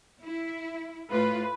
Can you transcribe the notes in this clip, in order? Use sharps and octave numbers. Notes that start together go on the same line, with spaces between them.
E4
A2 F4 B4